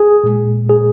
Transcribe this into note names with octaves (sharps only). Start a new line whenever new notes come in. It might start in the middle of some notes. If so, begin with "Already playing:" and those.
Already playing: G#4
A#2 G#3
G#4